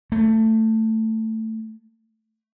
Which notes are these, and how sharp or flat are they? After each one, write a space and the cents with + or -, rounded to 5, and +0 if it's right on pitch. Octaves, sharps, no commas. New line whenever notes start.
A3 +15